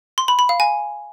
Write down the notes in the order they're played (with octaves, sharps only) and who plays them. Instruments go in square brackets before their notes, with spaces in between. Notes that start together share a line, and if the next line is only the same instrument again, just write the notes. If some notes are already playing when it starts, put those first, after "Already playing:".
[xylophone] C6
B5
B5
F5
G#5